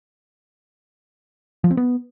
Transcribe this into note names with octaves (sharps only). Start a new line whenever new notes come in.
F3
C4
B3